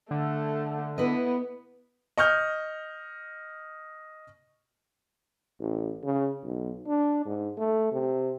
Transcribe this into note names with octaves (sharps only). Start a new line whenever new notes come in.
D3 A3
B3 E4 B4 D#5
D#5 C#6 F6 G6
A1
C#3
B1
D4
G#2
A3
C3